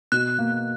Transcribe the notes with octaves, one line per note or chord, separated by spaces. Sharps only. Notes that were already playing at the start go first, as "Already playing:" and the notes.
B2 F#6
A#3